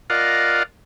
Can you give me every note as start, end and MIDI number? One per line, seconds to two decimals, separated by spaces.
0.10 0.63 65
0.10 0.63 70
0.10 0.63 74
0.10 0.63 75
0.10 0.63 77
0.10 0.63 78